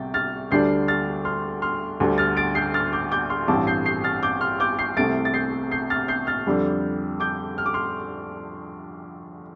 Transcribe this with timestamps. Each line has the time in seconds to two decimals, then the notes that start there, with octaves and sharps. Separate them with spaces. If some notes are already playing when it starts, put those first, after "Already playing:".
Already playing: C2 C3 G3 G5 A6
0.14 F6 A6
0.51 D2 D3 G3 D4 G6 C7
0.88 F6 A6
1.25 C6 F6
1.62 C6 F6
2.00 D2 D3 G3 D4
2.18 F6 A6
2.37 A6 D7
2.55 G6 C7
2.74 F6 A6
2.93 D6 G6
3.11 D6 G6
3.30 C6 F6
3.48 A1 G2 G3 C4 A5 D6
3.67 G6 C7
3.86 G6 C7
4.04 F6 A6
4.23 D6 G6
4.41 C6 F6
4.60 D6 G6
4.79 G6 C7
4.97 C2 C3 A3 C4 A6 D7
5.25 A6
5.34 G6 C7
5.71 G6 C7
5.90 F6 A6
6.08 G6 C7
6.27 F6 A6
6.46 F2 D3 G3 D4
7.20 D6 G6
7.58 F6
7.66 D6
7.74 C6 F6